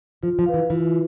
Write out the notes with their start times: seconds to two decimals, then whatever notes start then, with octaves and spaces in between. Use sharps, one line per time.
0.23 F3 F4
0.39 F3
0.46 B4 F5
0.54 E3
0.70 E3 F4